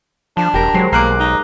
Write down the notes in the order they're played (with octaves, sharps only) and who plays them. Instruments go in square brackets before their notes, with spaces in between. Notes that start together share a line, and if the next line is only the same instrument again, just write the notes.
[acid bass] F3 [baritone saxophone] D4
[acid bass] E1 [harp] G4 A#4 A#5
[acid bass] F#3 [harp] G#3 C5 C7
[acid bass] B1 [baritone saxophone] A#3 [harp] D6 F#6 C7
[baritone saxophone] D#4